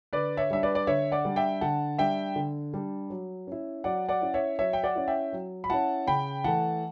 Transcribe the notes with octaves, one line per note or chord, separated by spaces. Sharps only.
D3 B4 D5
C#5 E5
G3 D4 E5
B4 D5
D5
D3 C#5 E5
D5 F#5
G3 D4
E5 G5
D3 F#5 A5
G3 D4 E5 G5
D3
G3 D4
F#3
C#4 E4
F#3 D5 F#5
D5 F#5
C#4 E4
C#5 E5
F#3 C#5 E5
G5
D5 F#5
C#4 E4
E5 G5
F#3
B5
C#4 E4 F#5 A5
C#3 G5 B5
E3 A3 F#5 A5